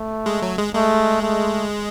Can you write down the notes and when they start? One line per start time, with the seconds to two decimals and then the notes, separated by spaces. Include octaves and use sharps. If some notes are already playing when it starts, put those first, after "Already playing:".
Already playing: A3
0.26 G#3
0.42 F#3
0.58 G#3
0.75 G#3 A3
1.22 A3